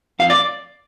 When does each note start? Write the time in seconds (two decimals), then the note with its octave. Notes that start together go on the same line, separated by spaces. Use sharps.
0.19 F2 F5
0.30 D5